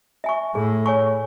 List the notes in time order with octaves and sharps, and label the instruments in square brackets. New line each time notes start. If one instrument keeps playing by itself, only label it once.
[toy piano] E5 G#5 C#6
[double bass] A2 [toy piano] G#4
[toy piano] C#5 G#5 C#6